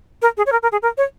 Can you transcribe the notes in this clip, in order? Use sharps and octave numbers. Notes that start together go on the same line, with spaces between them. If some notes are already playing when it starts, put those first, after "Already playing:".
A#4
G#4
C#5
A#4
A#4
G#4
A#4
C#5